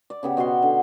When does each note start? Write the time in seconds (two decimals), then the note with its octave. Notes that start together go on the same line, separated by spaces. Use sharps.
0.10 D5
0.23 C#3 B3 G4
0.37 B2 F#4 F#5 C6
0.62 D3